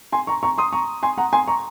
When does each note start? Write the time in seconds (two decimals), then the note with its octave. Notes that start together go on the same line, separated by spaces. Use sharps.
0.12 G#5 C6
0.27 A#5 C#6
0.43 A#5 C#6
0.58 C6 D#6
0.72 A#5 C#6
1.03 G#5 C6
1.18 F#5 A#5
1.33 G#5 C6
1.48 A#5 C#6